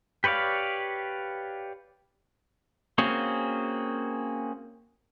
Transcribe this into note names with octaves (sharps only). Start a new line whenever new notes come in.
G4 B4 C#5 D5 F5
A#3 C4 C#4 F#4 G#4